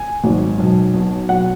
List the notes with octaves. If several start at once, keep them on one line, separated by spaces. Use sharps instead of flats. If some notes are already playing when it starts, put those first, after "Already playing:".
Already playing: G#5
G#1 G#2 F#3
B1 B2 F#3
B1 B2 F#3
B2 F#3 F#5